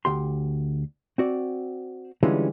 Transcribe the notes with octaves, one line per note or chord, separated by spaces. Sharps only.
D2 G4 C6
C4 F#4 D5
D3 E3 G3 G#3 C#4 F4